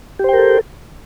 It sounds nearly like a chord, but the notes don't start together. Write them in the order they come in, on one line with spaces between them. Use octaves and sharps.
G4 C5 G5 A#4 A4